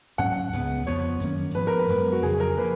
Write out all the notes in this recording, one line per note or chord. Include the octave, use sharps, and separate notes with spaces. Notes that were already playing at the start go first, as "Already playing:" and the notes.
G#2 F#3 A#3 C#4 F#5
C#2 C#3 F3 B3
F2 F3 B3 C#5
F#2 D#3 A#3 C#4
G#2 F3 B3 B4
A#4
B4
F#2 F3 G#3 B3
F#4
F2 C#3 F#3 G#4
A#4
F3 A#3 B4